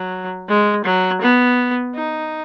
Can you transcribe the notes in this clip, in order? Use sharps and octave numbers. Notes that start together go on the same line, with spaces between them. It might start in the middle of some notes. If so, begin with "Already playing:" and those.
Already playing: F#3
G#3
F#3
B3
D#4